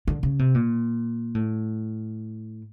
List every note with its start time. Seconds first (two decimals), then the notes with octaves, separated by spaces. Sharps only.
0.08 D3
0.23 C#3
0.39 C3
0.55 A#2
1.35 A2